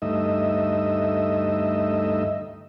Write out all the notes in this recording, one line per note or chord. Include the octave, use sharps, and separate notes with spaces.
D2 G2 A3 D#4 D#5 E5